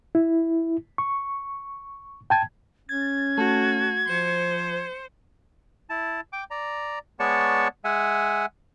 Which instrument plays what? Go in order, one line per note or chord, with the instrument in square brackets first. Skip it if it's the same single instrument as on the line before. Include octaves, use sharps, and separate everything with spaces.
[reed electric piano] E4
C#6
G5 A5 G#6
[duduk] C#4 [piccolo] G#6 [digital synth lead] A6
[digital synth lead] A3 [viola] F#4
[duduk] F3 [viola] C5 [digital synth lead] C#7
[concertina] E4 A5
G5 D6
D5 A#5
G#3 B3 C#5 D5 A5 C#6
G#3 E5 F#5 G#5